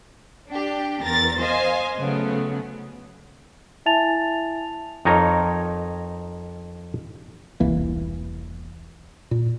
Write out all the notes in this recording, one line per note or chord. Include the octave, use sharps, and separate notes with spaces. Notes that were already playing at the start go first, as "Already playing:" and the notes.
D4 G4
E2 A#4 A6 A#6
C5 D#5 F5 G#5
C#3 F#3 A3 B3
E4 E5 G#5 A5 A6 F7
F2 D#4 A#4 C#5 A#5
E1 C2 E3 A#3
A#2